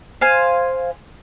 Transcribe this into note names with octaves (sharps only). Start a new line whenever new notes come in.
C5 F5 G#5